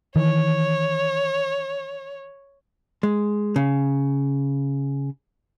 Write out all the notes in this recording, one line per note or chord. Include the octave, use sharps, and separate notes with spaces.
D#3 E3 C#5
G#3
C#3